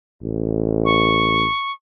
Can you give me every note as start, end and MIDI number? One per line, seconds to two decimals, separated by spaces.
0.23 1.47 33
0.85 1.72 85